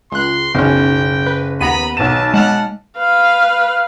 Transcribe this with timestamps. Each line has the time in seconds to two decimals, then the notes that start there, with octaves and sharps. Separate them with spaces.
0.12 C#2 C6 F#6
0.55 F#1 B1 C#4 G5
1.26 B4
1.61 D#2 B3 A#5 B5 D#7
1.97 B1 A5 E7
2.34 G#3 F#5 A5 F6
2.97 B4 F5